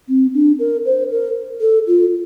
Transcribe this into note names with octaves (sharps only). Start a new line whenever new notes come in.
C4
D4
A#4
C5
A#4
A4
F4